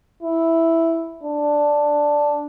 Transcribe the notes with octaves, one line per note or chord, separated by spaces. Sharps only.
E4
D4